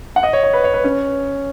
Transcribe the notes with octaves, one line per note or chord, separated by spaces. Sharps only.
F#5
D#5
C#5
C#5
B4
C#5
B4
C#4